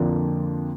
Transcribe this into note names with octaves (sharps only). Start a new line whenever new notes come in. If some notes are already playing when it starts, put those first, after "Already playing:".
Already playing: F2 D3 F3 A#3 D4